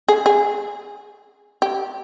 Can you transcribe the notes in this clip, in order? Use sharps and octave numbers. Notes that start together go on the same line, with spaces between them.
G#4
G#4
G4